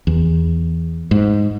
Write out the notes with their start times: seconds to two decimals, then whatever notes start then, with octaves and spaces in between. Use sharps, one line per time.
0.07 E2
1.11 G#2